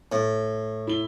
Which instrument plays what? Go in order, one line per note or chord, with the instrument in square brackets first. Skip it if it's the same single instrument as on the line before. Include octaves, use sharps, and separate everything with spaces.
[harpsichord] A2
[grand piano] E4 G7